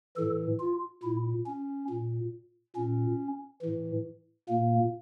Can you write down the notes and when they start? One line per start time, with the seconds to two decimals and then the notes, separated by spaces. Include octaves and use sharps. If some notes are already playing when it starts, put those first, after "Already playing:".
0.17 A2 E3 A4
0.60 F4
1.03 A#2 E4
1.46 C#4
1.90 A#2
2.76 A#2 C#4
3.62 A2 E3
4.48 A#2 A#3